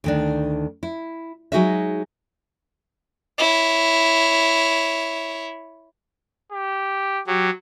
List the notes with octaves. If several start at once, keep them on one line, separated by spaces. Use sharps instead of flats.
D2 D#3 D4
E4
F#3 G#3 D#4 F#4 G#4 E5
E4 C#5
G4
F#3 G4